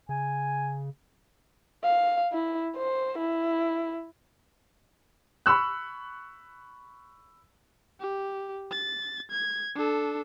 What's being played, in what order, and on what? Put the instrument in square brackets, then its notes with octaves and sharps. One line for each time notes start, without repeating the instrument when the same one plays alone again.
[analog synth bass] C#3 [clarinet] G#5
[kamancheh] F5
E4
C5
E4
[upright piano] B5 C#6 E6 F#6
[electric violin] G4
A6
G#6
D4 A4